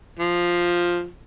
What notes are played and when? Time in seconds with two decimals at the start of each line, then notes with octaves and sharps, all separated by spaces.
0.19 F3